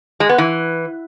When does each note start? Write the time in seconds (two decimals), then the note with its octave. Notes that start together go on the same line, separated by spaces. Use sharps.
0.20 G#3
0.29 B3
0.38 E3